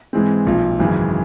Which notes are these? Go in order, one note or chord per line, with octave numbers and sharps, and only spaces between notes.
G#2 E3 G#3 C4
B1 A#2 F3
G#1 F#2 C#3 E3 G#3